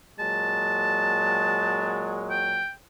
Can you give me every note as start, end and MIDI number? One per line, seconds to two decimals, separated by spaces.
0.19 2.65 46
0.19 2.65 54
0.19 2.65 56
0.19 2.14 81
2.31 2.71 79